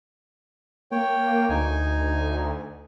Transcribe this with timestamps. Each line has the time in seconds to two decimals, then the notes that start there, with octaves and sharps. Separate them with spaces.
0.91 A#3 C#5 G5
1.49 D2 D#4 G#5